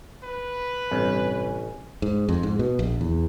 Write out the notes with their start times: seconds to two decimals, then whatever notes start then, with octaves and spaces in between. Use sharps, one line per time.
0.23 B4
0.92 A1 G2 C3 E3 C#4 G#5
2.02 G#2
2.29 F2
2.43 G#2
2.59 B2
2.79 A#1
3.01 E2